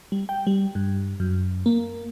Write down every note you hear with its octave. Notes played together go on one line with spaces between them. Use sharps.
G3
G5
G3
G2
F#2
A#3